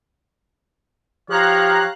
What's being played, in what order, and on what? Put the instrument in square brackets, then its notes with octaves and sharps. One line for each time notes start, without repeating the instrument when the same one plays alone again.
[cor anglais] F3 [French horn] G4 [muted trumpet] C#5 [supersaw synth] F5 A#5 F#6